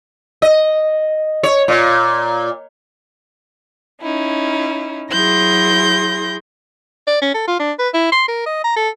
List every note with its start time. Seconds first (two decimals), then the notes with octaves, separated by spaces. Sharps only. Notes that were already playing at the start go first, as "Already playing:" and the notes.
0.42 D#5
1.43 C#5
1.68 A#2
4.00 C#4 D#4 E4
5.11 F#3 E4 G#4 C6 G6 A#6
7.07 D5
7.22 C#4
7.34 A4
7.48 F4
7.59 D4
7.79 B4
7.94 E4
8.12 C6
8.28 A#4
8.46 D#5
8.64 A#5
8.76 A4